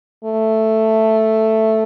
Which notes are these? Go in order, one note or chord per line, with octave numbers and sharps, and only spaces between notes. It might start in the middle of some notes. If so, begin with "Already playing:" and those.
A3